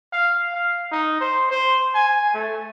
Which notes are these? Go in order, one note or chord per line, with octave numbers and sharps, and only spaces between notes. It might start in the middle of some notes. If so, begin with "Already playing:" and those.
F5
F5
D#4
C5
C5
G#5
A3